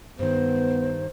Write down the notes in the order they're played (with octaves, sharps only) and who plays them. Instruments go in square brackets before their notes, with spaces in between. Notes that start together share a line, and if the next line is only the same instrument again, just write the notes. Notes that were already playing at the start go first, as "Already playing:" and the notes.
[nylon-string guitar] G2 D#3 [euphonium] B3 [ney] C5